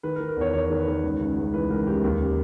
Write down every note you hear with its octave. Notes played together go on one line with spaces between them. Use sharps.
D#3 B4
A#4
D#3
A#4
E2 C#5
E2 C#5
D#3
B4
D#3
C#2
C#3
C#2
E3 B4
C#2 A#4
C#3 G4
D#2
C#3